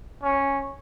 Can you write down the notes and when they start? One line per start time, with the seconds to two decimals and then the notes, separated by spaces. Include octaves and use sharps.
0.23 C#4